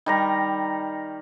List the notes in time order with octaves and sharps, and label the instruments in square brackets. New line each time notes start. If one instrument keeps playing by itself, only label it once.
[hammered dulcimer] D#3 G3 A#5